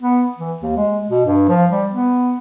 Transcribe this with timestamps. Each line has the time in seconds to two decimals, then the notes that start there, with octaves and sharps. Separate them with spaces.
0.01 B3
0.38 E3
0.62 D#2
0.76 G#3
1.11 B2
1.26 G2
1.48 F3
1.71 G3
1.93 B3